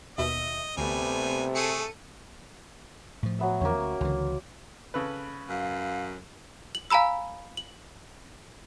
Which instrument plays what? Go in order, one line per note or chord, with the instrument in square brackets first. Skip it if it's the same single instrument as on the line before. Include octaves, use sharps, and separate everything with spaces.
[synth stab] D#2 B2 E5 [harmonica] D#5
[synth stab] D2 [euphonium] C3 [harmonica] G3 G#5 [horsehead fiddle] A3 B3
[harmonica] A3 G#4 [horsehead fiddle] A4 [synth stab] C#7 D#7
[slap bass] A2 F3
[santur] F#3 B3 E5
[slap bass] E2 D3 F3 [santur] A#3 C#4
[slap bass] D2
[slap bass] C#2 D3 E3 [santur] C6
[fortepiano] C#3 A4 B4
[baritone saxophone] F#2 [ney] F5
[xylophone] F#7
F5 G#5 A#5 B5 E6
F#7